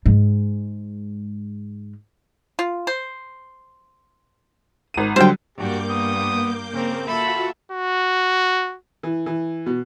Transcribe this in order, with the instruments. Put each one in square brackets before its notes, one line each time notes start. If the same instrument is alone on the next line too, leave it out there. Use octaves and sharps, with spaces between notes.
[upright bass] G#2 G#3
[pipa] F4
C5
[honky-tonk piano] G#1 D#7
[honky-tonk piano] D3 F#3 G3 [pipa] C5 G5
[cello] G2 [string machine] A#3 D6 G6 [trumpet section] F#4 G4
[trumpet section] B3 D#6
[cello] C#3 A#4 [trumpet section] C4
[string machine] F4 F#4 [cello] A4 E5 [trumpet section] B5
[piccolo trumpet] F#4
[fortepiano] E3
E3
B2